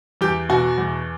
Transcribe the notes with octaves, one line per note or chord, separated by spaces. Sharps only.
E2 G4
B2 F#4
E2